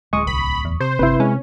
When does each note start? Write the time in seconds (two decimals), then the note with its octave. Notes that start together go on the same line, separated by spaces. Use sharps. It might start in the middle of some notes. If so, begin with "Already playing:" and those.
0.13 D1 G#3 C#6 D#6
0.27 C2 B5
0.65 E2
0.81 C3 C5
0.99 G1 C3 C4 E4 B4
1.20 G#3 C#4